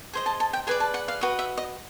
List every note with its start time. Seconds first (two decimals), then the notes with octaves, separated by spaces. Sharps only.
0.13 G#4 C5 D#5
0.26 A5
0.40 A5
0.53 G5
0.67 G#4 B4 D5 G#5
0.80 A5
0.94 F#5
1.08 F5
1.21 F#4 B4 D#5
1.39 E5
1.57 D#5